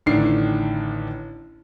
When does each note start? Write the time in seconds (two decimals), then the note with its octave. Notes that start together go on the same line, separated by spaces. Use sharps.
0.06 A1 D3 D#3 D4 C7